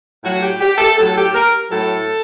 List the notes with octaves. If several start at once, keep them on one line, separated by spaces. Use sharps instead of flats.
A2 F#3 F#4
G4
G4
A4
A2 F#3 A4
G4
A#4
A2 F#3 A4